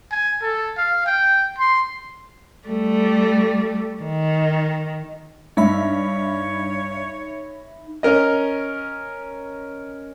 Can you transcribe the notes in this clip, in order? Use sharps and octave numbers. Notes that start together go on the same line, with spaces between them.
G#5
A4
F5
G5
C6
G3 A3
D#3
G2 D#4 C#5 E5 B5
C#4 A#4 D#5